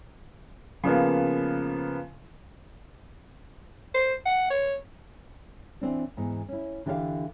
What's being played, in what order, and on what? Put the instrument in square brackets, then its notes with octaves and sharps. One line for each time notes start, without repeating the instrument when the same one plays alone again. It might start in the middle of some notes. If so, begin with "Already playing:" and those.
[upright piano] C#3 F3 A#3 B3
[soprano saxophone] C5
F#5
C#5
[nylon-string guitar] E3 C4 D4
G#2 E3 B3
C#4 E4
D3 E3 G4 A4 C#5 F5